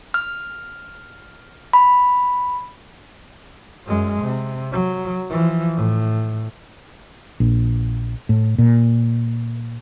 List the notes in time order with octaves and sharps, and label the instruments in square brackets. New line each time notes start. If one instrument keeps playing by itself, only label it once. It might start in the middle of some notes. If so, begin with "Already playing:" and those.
[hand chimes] F6
B5
[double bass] F#2 G#3
C3
F#3
E3 F3
A2
[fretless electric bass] A#1
A2
A#2